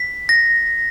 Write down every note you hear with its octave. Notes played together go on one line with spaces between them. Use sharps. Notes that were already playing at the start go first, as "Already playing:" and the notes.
Already playing: B6
A#6